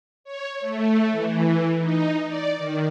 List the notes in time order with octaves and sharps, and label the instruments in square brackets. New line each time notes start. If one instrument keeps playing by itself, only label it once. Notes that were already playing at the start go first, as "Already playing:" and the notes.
[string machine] C#5
A3
E3
D#4
D5
D#3